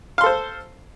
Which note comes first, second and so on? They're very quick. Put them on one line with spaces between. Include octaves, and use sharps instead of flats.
F5 C6 A4 C5